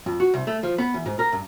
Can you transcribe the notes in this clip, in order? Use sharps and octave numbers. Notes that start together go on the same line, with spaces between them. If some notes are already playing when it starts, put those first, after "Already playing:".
F2
F#4
C2
A3
F3
B3
E2
G#2
A#4
G2